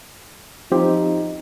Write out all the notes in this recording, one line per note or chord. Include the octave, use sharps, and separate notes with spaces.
F3 C4 D#4 G4